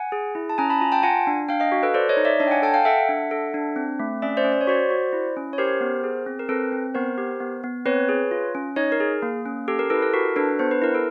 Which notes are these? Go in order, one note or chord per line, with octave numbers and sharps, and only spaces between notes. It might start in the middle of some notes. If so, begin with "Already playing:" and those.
Already playing: F#5 G#5
G#4
E4
A5
C#4 G#5 A#5
A5 B5
F4 G#5 A#5
G5 A5
F4 F#5 G#5
D4
D4 F5 G5
D#5 F5
F#4
A4 B4
A4 C5 D5
C#5 D#5
D#4
D5 E5
D4 C#5 D#5
G5
F#5 G#5
A4 G5 A5
F5 G5
A4 E5 F#5
D4
A4
D4
C4
A3
C#4 D5 E5
C5 D5
C#4
D5
C#5
F#4 C5 D5
F#4
E4
C#4
C#5
G4 A#4 C5
B3
G#4
C4
A#4
C4 A4 B4
C4
B3 A#4 C5
G4
B3
B3
C4 B4 C#5
G#4
F4
C#4
D#4 C#5 D#5
A#4
G#4
A#3
C#4
G4 A4
A#4
E4 A4 B4
A4
F#4 A#4
D4 A4 B4
B3 C5
B4
E4 A#4
A4